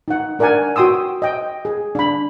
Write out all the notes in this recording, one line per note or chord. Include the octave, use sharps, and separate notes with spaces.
D#4 F#5
D4 A#4 D5 F#5 G#5
F#4 G5 C6 D#6 E6
D#5 G5
G#4
D4 B5